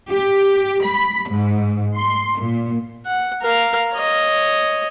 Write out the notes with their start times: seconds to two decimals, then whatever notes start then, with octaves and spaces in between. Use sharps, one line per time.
0.11 G4
0.83 B5
1.29 G#2
1.96 C6
2.39 A#2
3.06 F#5
3.42 A#4 F5
3.94 C#5 D#5